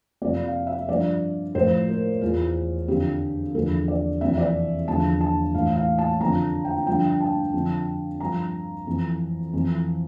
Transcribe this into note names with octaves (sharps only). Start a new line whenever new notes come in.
F2 C3 F3 D5
F5
E5
G2 F3 D5
A2 F3 C5
A#4
E2 E3 F4
F2 D3 F3 G4
E2 D3 F3 A4
D5
F2 C3 E3 E5
D5
E2 D3 F3 A5
A5
A2 E3 F5
F5
A5
F2 D3 F3 A#5
G5
G2 D3 F3 G5
A5
F2 D3 F3
G2 F3 A#5
F2 E3
F2 E3